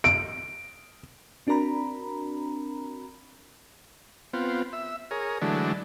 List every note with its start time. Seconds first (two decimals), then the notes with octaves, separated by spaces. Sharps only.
0.04 D7
1.47 C4 D4 F#4 A#4 A#5 B5
4.33 B3 C4 F4
4.73 E5
5.11 G#4 A#4 C#5
5.42 D3 E3 F#3 G#3 A3 D4